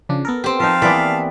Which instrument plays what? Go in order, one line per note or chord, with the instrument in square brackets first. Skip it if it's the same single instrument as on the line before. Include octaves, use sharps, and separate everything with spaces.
[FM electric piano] C#3 F3 D4
B3 A4 A#4
[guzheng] C4 G4
[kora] F3 D#4 [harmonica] F5 A5
[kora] E3 A#3 B3 [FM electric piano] G#4 F#5 C6 [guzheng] D5